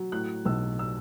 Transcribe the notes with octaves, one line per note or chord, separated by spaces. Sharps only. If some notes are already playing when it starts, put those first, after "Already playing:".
Already playing: F#3
A2 F#6
B1 E6
E6